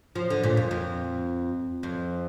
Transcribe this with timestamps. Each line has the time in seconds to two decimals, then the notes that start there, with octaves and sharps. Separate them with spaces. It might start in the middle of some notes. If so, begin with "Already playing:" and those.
0.15 F3
0.30 D3
0.44 A#2
0.57 F2
0.71 F2
1.83 F2